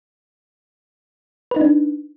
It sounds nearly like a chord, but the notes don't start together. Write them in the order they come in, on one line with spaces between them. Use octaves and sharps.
B4 D#4 D4